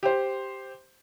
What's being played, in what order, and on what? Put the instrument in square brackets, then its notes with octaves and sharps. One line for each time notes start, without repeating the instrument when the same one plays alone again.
[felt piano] G4 C5